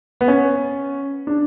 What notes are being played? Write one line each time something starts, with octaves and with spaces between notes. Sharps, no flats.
B3
C#4
D4